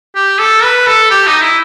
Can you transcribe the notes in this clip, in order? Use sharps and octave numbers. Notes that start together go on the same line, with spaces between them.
G4
A4
B4
A4
G4
D#4
E4